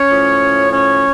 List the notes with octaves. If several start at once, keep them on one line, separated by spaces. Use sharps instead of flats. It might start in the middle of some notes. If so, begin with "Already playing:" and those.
Already playing: C#4 C#5
A2 F3
C#4 C#5